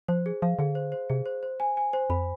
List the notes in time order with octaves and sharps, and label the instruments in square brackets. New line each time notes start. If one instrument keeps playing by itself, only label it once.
[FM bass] F3 [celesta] C5
[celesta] G#4
[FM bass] F3 [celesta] F5
[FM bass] D3 [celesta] G#4
[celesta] C5
C5
[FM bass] C3 [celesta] G#4
[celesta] C5
C5
G#5
G#5
C5
[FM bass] F2 [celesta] B5